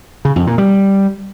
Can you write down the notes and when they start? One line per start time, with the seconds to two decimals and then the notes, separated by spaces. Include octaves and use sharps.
0.25 C#3
0.36 F2
0.47 A#2
0.58 G3